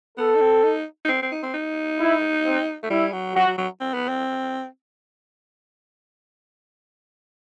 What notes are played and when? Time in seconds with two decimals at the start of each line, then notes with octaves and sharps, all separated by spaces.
0.17 B3 A4
0.35 D#4
0.41 C4
0.64 D#4
1.05 D#4
1.08 C4
1.22 C4
1.31 D#4
1.43 C4
1.54 D#4
2.00 E4
2.45 C4
2.83 A3
2.90 G3 E4
3.13 F#3
3.35 F#3 F#4
3.47 F#3
3.58 F#3
3.80 C4
3.94 B3
4.09 C4